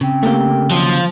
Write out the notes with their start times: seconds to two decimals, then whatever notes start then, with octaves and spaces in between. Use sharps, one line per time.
0.01 C#3 C4
0.23 A3 A#3 G4
0.71 D#2 F3 F#3